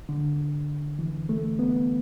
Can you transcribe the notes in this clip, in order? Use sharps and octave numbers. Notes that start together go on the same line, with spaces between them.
D3
E3
A3
B3